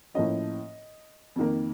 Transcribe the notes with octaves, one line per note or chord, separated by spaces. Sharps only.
A2 F3 A#3 C#4 D#5
F2 D#3 A#3